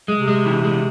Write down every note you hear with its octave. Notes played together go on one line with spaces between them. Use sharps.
G#3
C3
G#3
E3
G#3